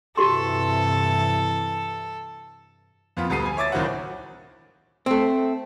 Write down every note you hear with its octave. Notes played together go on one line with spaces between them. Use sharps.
G2 C3 E3 F#4 G4 A4 C6
F2 A#2 B3 F4
D2 G3 B3 A4 C7 D#7
G#5
C#5 E5 D6 G#6 A6
C#2 A2 D#3 F#3 C4 F#5
A3 C4